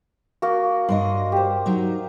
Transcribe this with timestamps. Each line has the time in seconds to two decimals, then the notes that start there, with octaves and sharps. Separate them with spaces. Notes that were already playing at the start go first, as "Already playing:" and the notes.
0.42 A#3 F#4
0.89 G2 D4 D#5 C6
1.32 G4 C5
1.66 F#3 D#4